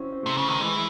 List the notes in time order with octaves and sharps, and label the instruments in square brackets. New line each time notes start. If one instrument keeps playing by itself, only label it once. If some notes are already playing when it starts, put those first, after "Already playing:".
Already playing: [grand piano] C4 C#4 E4 F#4
C4
[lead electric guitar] C3 [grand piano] A3
[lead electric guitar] C#3
D#3
[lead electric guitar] E3 [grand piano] G#3